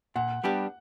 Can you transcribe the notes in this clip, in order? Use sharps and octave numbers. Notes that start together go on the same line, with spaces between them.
A#2 F#5
G3 B3 D4 G4